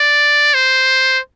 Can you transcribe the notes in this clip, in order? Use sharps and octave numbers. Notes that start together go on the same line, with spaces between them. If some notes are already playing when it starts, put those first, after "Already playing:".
Already playing: D5
C5